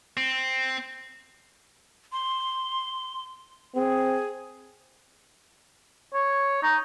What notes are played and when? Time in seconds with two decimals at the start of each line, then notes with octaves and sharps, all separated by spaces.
0.17 C4
2.12 C6
3.75 C4 G#4
6.14 C#5
6.63 D#4